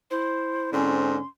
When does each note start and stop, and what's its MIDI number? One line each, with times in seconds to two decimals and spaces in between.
0.11 0.93 64
0.11 0.70 72
0.73 1.18 44
0.73 1.18 50
0.73 1.18 60
0.73 1.24 61
0.73 1.26 84